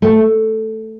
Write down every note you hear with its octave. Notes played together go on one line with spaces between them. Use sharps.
A3